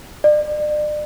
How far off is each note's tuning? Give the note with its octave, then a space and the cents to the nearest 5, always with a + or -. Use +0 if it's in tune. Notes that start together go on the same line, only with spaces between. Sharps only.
D5 +40